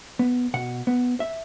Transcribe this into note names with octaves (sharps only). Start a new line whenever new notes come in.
B3
B2 F#5
B3
E5